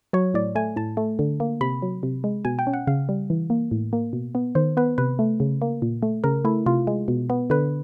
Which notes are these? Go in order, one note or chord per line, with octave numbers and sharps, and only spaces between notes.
F#3 C#5
A2 D5
A3 G#5
A2 A5
A3
D3
A#3
C3 B5
F#3
C3
G#3
B2 G#5
G5
C#4
F#5
C#3 F5
G3
E3
A#3
A2
A#3
B2
B3
D#3 C5
B3 B4
C3 B4
A3
C#3
A#3
A#2
A3
C#3 A#4
A3 E4
C3 F4
G#3
B2
B3
D3 B4